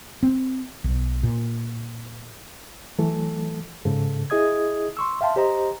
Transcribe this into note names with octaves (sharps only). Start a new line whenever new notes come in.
C4
B1
A#2
E3 F#3 A3 A4
G#2 C#3 A4
E4 G#4 D#5 D#6 G#6
C6 C#6 E6
E5 F5 G5 A5 C6
G4 C5 D#5 A#5